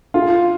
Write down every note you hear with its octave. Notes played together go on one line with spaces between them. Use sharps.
F4